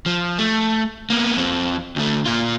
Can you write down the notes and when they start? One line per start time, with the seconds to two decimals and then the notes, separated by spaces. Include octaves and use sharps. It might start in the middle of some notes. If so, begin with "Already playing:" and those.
0.06 F3
0.38 A3
1.10 A#3 B3
1.37 F2 C4
1.96 D2 A3
2.26 A#2 F4